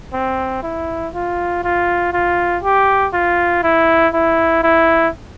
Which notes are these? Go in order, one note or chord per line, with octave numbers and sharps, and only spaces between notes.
C4
E4
F4
F4
F4
G4
F4
E4
E4
E4